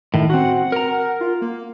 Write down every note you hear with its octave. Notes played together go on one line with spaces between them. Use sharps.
A2 D#3
C4 F#4 F#5
A#4 A#5
F4
A#3